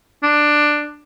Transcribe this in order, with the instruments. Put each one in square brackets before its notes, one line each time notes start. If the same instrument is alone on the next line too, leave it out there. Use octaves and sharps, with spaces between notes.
[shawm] D4